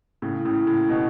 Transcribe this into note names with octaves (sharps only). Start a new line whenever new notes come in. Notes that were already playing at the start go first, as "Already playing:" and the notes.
A2 C#3
A2 C#3
A2
B2